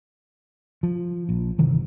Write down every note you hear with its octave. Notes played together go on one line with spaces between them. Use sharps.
F3
A#1
G1 C3 D#3 E3